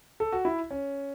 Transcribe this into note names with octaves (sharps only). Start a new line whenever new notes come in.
A4
F#4
E4
C#4